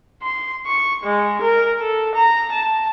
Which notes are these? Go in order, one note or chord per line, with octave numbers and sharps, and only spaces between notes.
C6
C#6
G#3
A#4
A4
A#5
A5